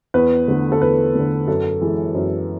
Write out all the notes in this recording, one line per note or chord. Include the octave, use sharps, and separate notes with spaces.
E2 B4
D3 A3
A4
E2 B4
D3 A3
F#2 A4
E3 G#3
F#2